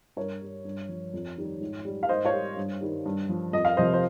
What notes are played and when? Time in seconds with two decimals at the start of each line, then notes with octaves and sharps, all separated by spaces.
0.17 G2 A#4 C#5
0.42 G3
0.65 G2
0.89 F3
1.14 F2
1.38 D#3 G3
1.61 G#2
1.85 G3
2.03 F5
2.09 G#2 C5 D#5
2.25 C#5 F5
2.33 G3
2.57 G2
2.81 D#3 G3
3.05 G2
3.29 F3
3.53 F2 D#5
3.65 F5
3.77 C3 F3 C5 D#5
3.94 C5